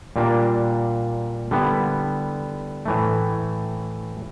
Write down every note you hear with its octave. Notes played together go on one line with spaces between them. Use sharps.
A#2 G3 A#3 D4
D3 G3 B3 E4
A2 E3 A3